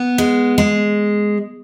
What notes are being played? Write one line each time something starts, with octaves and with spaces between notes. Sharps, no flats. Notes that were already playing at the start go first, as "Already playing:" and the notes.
Already playing: B3
G#3
G#3